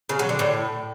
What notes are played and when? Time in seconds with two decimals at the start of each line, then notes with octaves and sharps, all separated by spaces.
0.09 C#3
0.19 F#3
0.29 D3
0.39 A2